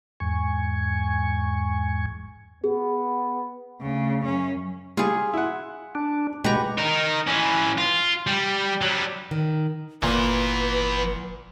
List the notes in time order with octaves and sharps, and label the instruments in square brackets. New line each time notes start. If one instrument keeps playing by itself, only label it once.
[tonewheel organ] E2 G#2 G#5 C#6
[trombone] B3 [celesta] G#4
[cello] D2 C#3
F#2 C#4
[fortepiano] G3 [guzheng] F4 [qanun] G#4 C#6
[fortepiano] E4 F#5
[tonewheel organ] D4
[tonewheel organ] B2 G#3 [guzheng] G4 B4 F#5 [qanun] A#5 C#6
[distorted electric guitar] D#4 A#4
E3 C#4
F4
G3
F#3 G3
[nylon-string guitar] D#3
[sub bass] G1 [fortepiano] A#2 [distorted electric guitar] E3 B3 [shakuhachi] B4